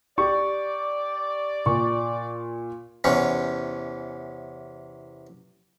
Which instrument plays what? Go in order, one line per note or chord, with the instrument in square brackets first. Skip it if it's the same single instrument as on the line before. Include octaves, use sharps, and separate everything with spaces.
[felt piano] G4 [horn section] D5 [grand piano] C#6
[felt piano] A#2 [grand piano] C#6
[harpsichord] E2 C3 E3 C#4